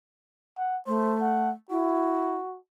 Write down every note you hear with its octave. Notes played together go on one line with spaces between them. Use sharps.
F#5
A3 C5
F#5
E4 F#4